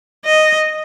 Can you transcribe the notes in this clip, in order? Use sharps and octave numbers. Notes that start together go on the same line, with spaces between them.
D#5